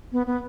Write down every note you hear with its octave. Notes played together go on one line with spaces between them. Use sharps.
B3
B3